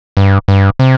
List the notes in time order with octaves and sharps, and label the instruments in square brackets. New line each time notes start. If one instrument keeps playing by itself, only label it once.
[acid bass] G2
G2
C3